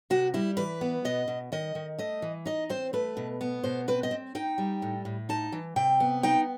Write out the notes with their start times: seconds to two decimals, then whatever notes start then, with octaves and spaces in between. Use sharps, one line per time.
0.10 C3 F#4
0.34 G3 E4
0.57 E3 B4
0.81 B3
1.05 B2 D#5
1.28 B2
1.52 D#3 D#5
1.75 D#3
1.98 A3 D#5
2.22 E3
2.46 D#4 D#5
2.70 C4 C5
2.93 A3 B4
3.17 B2
3.41 B3
3.64 B2 C5
3.88 C4 B4
4.03 D#5
4.11 C4
4.35 D#4 G5
4.58 G3
4.82 A2
5.05 A2
5.29 D#4 A5
5.52 E3
5.76 C3 G5
6.00 B3
6.23 D#4 G5